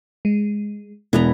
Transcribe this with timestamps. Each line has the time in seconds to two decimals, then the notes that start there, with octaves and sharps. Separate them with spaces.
0.25 G#3
1.13 E1 E3 B3 A#5